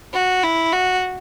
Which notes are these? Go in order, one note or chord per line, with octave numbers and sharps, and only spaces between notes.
F#4
E4
F#4